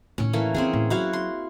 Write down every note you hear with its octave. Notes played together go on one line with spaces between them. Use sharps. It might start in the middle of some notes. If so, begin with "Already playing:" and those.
A2 D#3 C#4
E3 A3 A#3
D#3 C4 C#4 E4 G#4
A2
F#3 E4 F#4 F5
C6